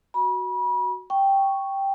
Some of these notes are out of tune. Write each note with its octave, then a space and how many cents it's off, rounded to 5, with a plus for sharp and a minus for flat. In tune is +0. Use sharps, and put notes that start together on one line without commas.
F#4 +0 B5 -35
G5 +0 C#6 +0